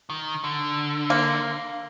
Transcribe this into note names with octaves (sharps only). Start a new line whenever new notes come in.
D#3
D3
A#3